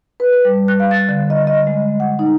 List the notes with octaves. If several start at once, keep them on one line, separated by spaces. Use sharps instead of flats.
B4
B4
G3
F#6
F5
A6
D3
D#5
D#5
G#3
F#5
D#4